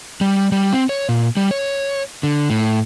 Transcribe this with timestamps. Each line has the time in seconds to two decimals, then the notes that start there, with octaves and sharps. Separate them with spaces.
0.21 G3
0.52 G3
0.73 C4
0.89 C#5
1.09 A#2
1.37 G3
1.51 C#5
2.23 D3
2.50 A2